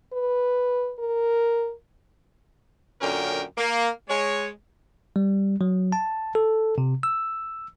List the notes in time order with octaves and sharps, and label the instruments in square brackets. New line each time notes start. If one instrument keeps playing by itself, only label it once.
[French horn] B4
A#4
[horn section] F#2 A#2 D3 C#4 A#4 G5
A#3
G#3 C#5
[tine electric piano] G3
F#3
A5
A4
C3
E6